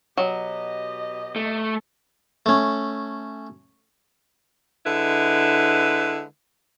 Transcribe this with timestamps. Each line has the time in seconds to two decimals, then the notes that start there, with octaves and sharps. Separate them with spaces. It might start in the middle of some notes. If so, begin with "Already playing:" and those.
0.17 B2 F#3 G4 D#5
1.36 A3
2.46 A3 C#4
4.85 D3 G#3 E4 B4